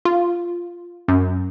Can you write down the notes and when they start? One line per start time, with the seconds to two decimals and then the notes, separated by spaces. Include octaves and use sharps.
0.05 F4
1.08 F#2